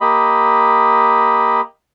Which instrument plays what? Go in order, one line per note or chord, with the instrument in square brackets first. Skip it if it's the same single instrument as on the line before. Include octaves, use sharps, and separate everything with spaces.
[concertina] A#3 G4 D#5 B5